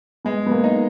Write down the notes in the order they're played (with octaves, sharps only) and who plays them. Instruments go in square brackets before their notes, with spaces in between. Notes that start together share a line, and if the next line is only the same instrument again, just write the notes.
[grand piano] G#3 [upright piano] B3
[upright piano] B3
A#3
[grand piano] D#4